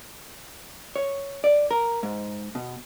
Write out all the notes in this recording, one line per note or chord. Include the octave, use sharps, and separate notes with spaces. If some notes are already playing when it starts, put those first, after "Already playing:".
C#5
D5
A#4
G#2
B2